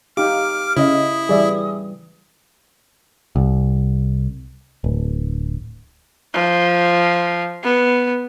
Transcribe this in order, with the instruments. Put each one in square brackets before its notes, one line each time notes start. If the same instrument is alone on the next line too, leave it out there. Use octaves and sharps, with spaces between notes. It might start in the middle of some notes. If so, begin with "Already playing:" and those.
[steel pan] D#4 G4 [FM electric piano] F5 [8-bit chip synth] D6 [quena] F6
[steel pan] C#3 [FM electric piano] C#4 D#5 [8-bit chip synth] E4 [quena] D#6
[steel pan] E3 G3 [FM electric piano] G#4 D5 E5
[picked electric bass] C2
D1
[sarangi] F3
B3